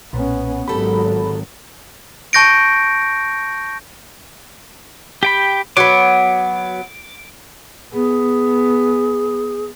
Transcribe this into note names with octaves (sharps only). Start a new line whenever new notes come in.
B1 A#2 B3 C#4
G#1 D#3 F#3 G4 A4 A#4 B5
A5 C#6 G6 A#6 C#7 D7
G4 G5 B5
F#3 B3 D6
B3 G#4